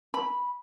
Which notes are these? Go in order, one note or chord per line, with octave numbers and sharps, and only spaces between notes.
B5